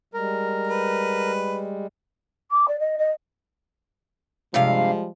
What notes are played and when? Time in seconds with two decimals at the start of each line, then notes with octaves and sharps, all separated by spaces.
0.14 G3 G#3 A#4
0.67 B4
2.51 D6
2.68 D5
2.79 D#5
2.98 D#5
4.54 G2 C3 F3 G3 G#3 F5